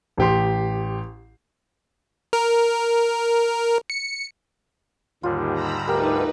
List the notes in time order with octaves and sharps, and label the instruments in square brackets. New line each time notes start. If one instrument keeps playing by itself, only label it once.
[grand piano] A1 G4 C6
[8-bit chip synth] A#4
C#7
[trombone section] D#2 [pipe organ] G#2 D3 G3 [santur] F4
[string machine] A#5 B5 E6
[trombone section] D2 [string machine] D#4 B4 [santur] G4 A#4